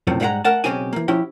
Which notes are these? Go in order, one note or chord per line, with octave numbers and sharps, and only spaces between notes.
F#2 A2 C3 F3
G#2 G3 G#3 F5 F#5 A#5
A3 A#4 F#5 A5
B1 A#2 C#3 C4 G4 G#5
E3 A#3
F3 C#4 E4 G4